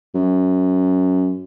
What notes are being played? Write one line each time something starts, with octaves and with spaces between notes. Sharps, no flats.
F#2